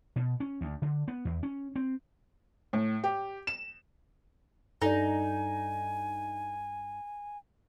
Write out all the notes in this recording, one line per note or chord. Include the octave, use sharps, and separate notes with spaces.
B2
C#4
D2
D3
B3
E2
C#4
C4
A2
G4
E7
G2 D#4 A4 D5 G#5